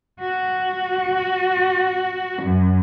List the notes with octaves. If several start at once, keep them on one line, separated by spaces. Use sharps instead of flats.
F#4
F#2